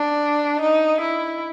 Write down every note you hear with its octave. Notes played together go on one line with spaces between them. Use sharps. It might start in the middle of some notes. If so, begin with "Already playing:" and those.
Already playing: D4
D#4
E4